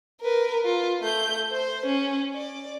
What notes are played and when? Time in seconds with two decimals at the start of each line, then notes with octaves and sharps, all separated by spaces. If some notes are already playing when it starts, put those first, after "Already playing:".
0.22 A#4 B4
0.65 F4
1.00 A3 G6
1.52 C5
1.86 C#4
2.35 D5